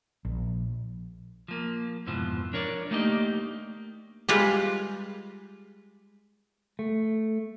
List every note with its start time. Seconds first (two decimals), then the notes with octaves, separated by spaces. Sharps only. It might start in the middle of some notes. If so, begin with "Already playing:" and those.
0.25 A#1
1.48 F3 A#3
2.07 F2 G#2 B2 E3 F3
2.53 D4 A#4 C#5 D5
2.91 A3 A#3 D4 D#4 G4 D#5
4.29 G3 G#3 F4 B4
6.79 A3